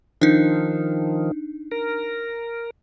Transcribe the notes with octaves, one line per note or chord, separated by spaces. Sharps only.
D#3 F3 D4 D#4
A#4